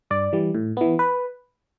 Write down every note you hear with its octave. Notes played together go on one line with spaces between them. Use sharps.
G2 D5
E3 G3
A2
E3 B3
B4